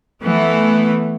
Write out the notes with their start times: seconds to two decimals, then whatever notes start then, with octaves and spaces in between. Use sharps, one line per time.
0.22 E3 A3 B3